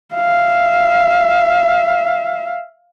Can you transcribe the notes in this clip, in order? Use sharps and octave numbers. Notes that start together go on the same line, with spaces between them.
E5 F5